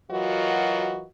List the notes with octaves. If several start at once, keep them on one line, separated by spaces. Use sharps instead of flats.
E3 F#3 F4 F#4 A#4 D#5